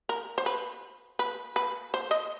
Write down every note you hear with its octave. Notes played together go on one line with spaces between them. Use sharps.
A#4
C5
B4
B4
B4
C5
D#5